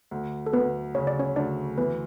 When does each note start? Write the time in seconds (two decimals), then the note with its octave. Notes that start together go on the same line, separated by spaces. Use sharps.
0.11 D2
0.46 A4
0.53 D2 B3 B4
0.95 C#3 C#5
1.07 D5
1.19 C#4 C#5
1.36 D2 D4 D5
1.78 E3 B3 B4